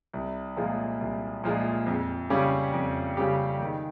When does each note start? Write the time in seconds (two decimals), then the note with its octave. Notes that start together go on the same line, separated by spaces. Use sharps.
0.14 C2
0.57 A#2 F3 G#3
1.01 C2
1.44 A#2 F3 G#3
1.87 F2
2.30 C#3 G3 C#4 G4
2.74 F2
3.17 C#3 G3 C#4 G4
3.60 D#3